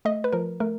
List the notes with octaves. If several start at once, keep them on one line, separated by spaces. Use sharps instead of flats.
A3 D#5
B4
F3 A#4
A3 A#4